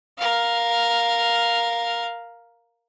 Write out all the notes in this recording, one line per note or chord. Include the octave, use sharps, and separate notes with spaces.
A#4 F5